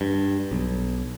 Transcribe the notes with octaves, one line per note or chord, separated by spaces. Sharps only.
G2
B1